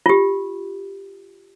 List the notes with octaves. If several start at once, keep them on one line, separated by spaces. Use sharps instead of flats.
F4 G4